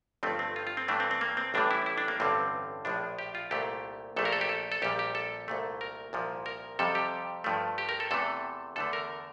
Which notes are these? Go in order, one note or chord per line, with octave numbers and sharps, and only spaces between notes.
G1 G2 F3 A3 C4
C4
F4
F4
C4
G2 E3 A3 D4
C4
C4
A#3
C4
A1 A2 E3 G3 D4
E4
E4
D4
A#3
A1 G2 D3 G3 C4
A#1 A2 F3 D4
G4
F4
C2 A#2 A3 G4
A#1 A#2 A3 A4
A#4
A4
G4
A4
A4
A#1 A#2 G3 G4
G4
A4
C2 A#2 A3
A#4
C2 A#2 F3
A#4
F2 C3 G3 A4
G4
G2 F3 A3
G4
A#4
A4
E2 C3 E3 A3 A4
E2 D3 A3 A4
A#4